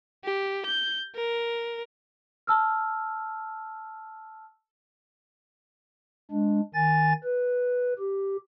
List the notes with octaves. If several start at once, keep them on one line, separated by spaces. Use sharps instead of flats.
G4
G6
A#4
A5 E6 F6
G#3 D4
D#3 G#5 A6
B4
G4